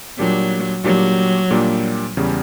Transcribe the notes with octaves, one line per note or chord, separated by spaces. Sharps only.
A#2 F#3 G3 A#3 D4 G4
A#2 F#3 G3 A#3 D4 G4
A#2 G3 A#3 D4 G4
E2 C#3 G3